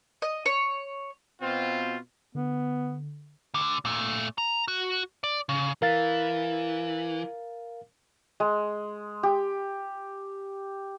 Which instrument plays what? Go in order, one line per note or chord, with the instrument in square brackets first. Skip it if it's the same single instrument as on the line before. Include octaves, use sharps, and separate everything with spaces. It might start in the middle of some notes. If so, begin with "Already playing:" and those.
[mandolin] D#5
C#5
[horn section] B2 C4 F4
[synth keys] D3 [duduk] B3
[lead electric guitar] D2 D3
A#2 A3
A#5
F#4
D5
C#3
[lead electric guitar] E3 [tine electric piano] A#4 F5 A6
[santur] G#3
G4